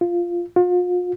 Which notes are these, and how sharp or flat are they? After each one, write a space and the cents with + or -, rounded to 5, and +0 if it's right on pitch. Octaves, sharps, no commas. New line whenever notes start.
F4 -5
F4 +40